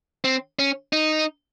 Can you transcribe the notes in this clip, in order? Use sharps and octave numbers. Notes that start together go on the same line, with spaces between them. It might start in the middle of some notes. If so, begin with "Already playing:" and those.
C4
C#4
D#4